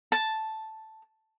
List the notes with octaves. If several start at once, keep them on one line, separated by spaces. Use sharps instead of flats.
A5